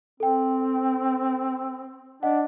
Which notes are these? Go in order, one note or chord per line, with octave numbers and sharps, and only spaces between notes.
C4 A4 G5
D4 D#5 F#5